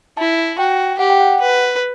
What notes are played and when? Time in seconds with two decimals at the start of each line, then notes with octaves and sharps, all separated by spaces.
0.17 E4 A5
0.58 F#4 G5
0.99 G4 F#5
1.10 G5
1.20 F#5
1.41 B4